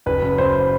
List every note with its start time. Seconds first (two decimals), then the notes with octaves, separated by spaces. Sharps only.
0.06 F#1 B4
0.22 F#2
0.38 F#1 C5